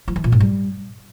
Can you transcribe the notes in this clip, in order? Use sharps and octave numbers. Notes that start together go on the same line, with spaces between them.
F3
E3
A#2
G#2
G3